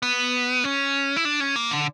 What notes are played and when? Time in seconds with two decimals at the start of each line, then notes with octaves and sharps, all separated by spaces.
0.03 B3
0.64 C#4
1.16 E4
1.25 D4
1.40 C#4
1.56 A#3
1.71 D3